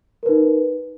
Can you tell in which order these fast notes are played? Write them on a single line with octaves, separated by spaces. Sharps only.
A#4 B4 D#4